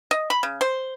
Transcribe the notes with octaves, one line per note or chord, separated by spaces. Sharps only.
D#5
B5
C#3
C5